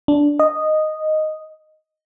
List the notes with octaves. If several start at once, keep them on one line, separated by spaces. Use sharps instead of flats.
D4
D#5